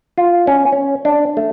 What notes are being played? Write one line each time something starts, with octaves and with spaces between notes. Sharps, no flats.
F4
C#4
C#4
D4
A3